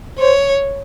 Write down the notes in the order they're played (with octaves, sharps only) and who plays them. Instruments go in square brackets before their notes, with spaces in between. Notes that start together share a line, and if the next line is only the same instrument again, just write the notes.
[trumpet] C5 [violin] C#5